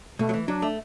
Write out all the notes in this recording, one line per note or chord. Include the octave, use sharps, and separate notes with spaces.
B2 A3
F#3
E3
F#3 D4
A3